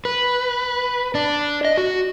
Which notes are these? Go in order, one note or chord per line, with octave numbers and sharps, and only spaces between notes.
B4
D4
D#5
F#4